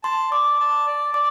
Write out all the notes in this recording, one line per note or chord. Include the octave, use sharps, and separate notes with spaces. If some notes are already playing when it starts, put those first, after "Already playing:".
A5 C6
D5 D6
A5
D5
D5 D6